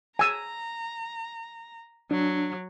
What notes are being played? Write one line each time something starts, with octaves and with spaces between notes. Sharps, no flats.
G#5 A#5 E6
F#3 D4